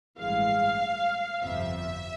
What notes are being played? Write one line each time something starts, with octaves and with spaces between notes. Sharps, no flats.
A1 G2 E3 G#3 F5
G1 F2 C3 F3 E5